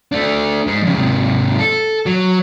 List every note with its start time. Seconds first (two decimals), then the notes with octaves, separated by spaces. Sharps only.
0.12 A3 D4
0.67 G#2 G#3
0.83 F2 C#3
0.94 G#2 C3
1.59 A4
2.06 F#3